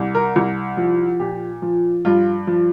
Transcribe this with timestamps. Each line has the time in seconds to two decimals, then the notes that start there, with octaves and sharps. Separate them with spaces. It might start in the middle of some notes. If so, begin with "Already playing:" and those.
Already playing: C2
0.15 A#4
0.36 C2
0.77 F3
1.20 A#2 G4
1.62 F3
2.05 G2 F4
2.47 F3